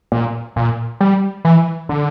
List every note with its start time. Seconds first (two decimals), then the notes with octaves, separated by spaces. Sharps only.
0.12 A#2
0.56 A#2
1.00 G3
1.45 E3
1.89 D3